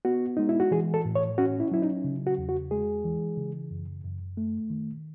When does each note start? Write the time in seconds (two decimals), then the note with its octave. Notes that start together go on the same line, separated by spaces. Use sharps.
0.05 B3 F#4
0.37 G#3 D#4
0.49 E4
0.60 F#4
0.71 E3 G#4
0.94 A4
1.05 A2
1.15 C#5
1.38 C#4 F#4
1.60 E4
1.71 F#3 E4
1.82 D#4
2.04 C#3
2.27 F#4
2.38 E2
2.49 F#4
2.71 G#3 G#4
3.05 E3
3.37 C#3
3.71 F#2
4.04 F#2
4.37 A3
4.70 D#3